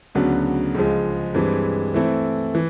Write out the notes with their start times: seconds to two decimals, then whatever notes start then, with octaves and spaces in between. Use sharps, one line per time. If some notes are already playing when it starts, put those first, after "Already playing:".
0.15 D2 C#3 F#3 B3 D4
0.75 C#2 C#3 F3 G#3
1.35 G2 E3 G#3 C4
1.94 E3 A3 C4 E4
2.55 E3